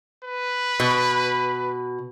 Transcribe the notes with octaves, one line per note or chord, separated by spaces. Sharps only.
B4
B2